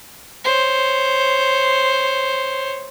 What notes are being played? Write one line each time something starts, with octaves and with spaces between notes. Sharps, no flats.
C5 C#5